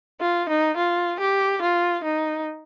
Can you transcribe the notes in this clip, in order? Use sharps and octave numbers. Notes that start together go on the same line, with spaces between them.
F4
D#4
F4
G4
F4
D#4